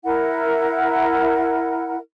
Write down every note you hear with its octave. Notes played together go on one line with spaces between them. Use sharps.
E4 A#4 F#5